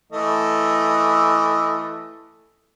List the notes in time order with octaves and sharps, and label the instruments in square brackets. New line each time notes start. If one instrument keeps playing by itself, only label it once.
[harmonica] E3 A3 D#5